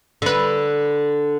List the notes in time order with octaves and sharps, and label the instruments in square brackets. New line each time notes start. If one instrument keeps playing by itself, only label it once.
[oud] D3 B4